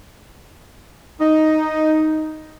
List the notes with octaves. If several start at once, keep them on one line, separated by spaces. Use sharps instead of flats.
D#4